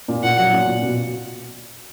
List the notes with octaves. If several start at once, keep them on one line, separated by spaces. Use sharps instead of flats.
A#2
A#2 F#5
F#3
A#2
A#2
B2